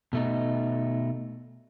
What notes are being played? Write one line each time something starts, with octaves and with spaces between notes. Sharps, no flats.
B2 A3 D#4